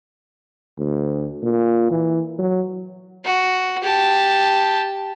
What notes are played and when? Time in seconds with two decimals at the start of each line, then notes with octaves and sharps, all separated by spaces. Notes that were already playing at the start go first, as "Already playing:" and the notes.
0.78 D2
1.43 A#2
1.91 E3
2.39 F#3
3.25 F#4
3.83 G4 A5